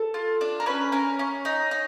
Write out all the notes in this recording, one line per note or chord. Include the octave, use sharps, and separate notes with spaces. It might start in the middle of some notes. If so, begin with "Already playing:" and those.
Already playing: A4
F4
D4
A#4
C#4 B4
C#4 A#4
C#4
D#4
D#4